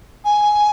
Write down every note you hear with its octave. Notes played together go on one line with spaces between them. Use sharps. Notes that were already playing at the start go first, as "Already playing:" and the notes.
G#5